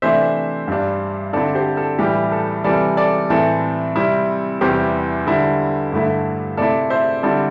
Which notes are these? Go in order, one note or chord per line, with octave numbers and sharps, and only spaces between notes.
C3 E3 A3 D4 C5 E5
G2 G3 D4
D3 C4 E4 A4 D5
G4 C5
A4
A2 E3 G3 G4
A4
C3 E3 G3 A4 D5
A4 D5
A2 E3 C4 A4
C3 G3 C4 E4
E2 C3 G3 E4 G4 C5
D3 G3 E4
G2 D3 A3 E4
C3 A3 E4 A4 D5
C5 E5
D3 G3 C4 E4 A4 D5